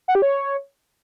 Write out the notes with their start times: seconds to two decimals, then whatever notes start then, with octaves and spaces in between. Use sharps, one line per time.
0.08 F#5
0.15 G4
0.22 C#5